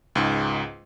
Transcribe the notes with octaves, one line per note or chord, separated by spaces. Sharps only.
C#2 G#2